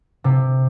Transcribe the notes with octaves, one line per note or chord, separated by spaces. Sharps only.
C3